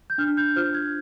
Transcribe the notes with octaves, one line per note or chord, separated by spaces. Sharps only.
G6
D4 F6
G6
F4 C5 F6
G#6